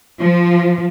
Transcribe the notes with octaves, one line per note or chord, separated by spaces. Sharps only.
F3